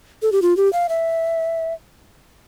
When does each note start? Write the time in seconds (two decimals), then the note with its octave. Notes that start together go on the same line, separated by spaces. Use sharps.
0.22 A4
0.32 G4
0.42 F4
0.57 G4
0.73 F5
0.89 E5